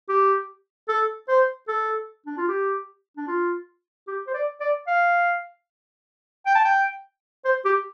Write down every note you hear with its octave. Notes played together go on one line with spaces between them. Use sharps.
G4
A4
C5
A4
D4
F4
G4
D4
F4
G4
C5
D5
D5
F5
G5
A5
G5
C5
G4